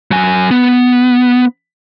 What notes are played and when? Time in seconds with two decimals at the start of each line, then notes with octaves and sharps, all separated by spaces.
0.11 F#3 G#5
0.51 B3